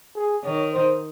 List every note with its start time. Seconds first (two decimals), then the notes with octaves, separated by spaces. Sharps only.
0.16 G#4
0.44 D#3 C#5
0.73 C5